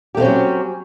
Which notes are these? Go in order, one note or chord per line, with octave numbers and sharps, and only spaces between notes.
F#3 A3 C4 C#4 G4